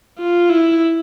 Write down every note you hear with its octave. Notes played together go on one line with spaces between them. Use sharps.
F4
E4